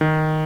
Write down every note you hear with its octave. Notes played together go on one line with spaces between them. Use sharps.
D#3